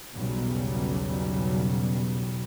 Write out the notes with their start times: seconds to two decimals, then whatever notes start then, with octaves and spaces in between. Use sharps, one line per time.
0.15 B1 E2 C#3 F#3 G3